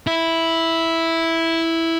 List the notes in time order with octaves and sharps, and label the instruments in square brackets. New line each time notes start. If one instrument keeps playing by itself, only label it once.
[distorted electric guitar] E4